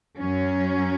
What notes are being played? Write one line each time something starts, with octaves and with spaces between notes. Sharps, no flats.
F#2 F#3 C#4